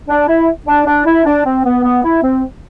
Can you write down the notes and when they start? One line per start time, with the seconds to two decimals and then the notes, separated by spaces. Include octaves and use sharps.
0.09 D4
0.28 E4
0.66 D4
0.86 D4
1.05 E4
1.24 D4
1.45 C4
1.65 B3
1.83 B3
2.03 E4
2.22 C4